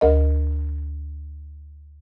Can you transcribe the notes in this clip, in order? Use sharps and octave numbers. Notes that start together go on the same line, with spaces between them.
D2 A#4 D#5